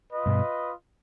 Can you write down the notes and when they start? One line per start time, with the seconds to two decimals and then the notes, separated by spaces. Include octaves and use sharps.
0.11 F4 B4 D#5
0.26 G2 B2